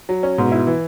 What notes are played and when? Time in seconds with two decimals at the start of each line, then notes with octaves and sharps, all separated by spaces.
0.09 F#3
0.23 C#4
0.38 G#2 B2
0.52 E4
0.67 E3